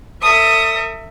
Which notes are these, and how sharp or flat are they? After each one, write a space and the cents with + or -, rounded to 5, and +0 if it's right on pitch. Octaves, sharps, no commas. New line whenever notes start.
A4 +40 E5 +0 D#6 +0